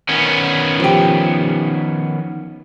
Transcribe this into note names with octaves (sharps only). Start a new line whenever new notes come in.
D#3 B3 C#4
F3 G4